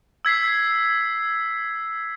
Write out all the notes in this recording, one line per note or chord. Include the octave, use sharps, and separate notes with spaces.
E6 G#6 B6 C7